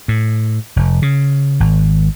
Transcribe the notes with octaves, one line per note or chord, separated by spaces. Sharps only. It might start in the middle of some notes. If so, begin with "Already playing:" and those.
A2
F1
C#3
G#1